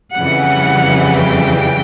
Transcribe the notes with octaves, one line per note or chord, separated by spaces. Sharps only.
F2 C#3 E3 G3 F#5
G5